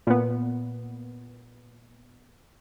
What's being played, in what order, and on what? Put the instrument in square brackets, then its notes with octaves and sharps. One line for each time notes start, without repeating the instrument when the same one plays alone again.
[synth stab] A#2 B3